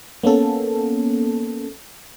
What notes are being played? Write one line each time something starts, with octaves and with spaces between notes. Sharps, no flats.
A#3 B3 C#4 A4